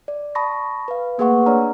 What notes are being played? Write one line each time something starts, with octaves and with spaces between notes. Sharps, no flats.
D5
A5 B5 C#6 D#6 A#6
B4 F5
A3 A#3 G#4 B4 F#5 C#6
D4 C#5 D5 A#5 F6